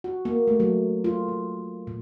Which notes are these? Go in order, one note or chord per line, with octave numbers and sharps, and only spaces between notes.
F#4
A#3
A3
F#3
F4
F#3
A#2